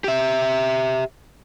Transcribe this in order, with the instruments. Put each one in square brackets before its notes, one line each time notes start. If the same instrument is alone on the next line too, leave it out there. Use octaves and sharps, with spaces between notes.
[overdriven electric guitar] G4 E5